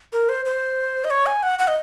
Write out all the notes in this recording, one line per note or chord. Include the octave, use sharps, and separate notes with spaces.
A#4
C5
C5
D#5
C#5
G#5
F#5
F#5
D#5